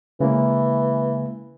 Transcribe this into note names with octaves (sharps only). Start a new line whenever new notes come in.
C#3 E3 G#3 A#3